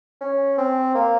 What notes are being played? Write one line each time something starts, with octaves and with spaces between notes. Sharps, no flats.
C#4
C4
A#3